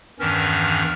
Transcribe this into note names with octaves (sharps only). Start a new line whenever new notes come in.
E2 G2 D#3 E3 C#4 F6